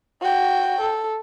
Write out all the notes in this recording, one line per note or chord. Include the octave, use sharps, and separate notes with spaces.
F#4 G5
A4